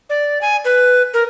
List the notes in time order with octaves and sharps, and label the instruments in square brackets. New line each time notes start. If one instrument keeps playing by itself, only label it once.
[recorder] D5
G#5
B4
A#4